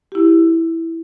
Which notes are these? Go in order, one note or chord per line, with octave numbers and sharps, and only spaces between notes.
E4 G4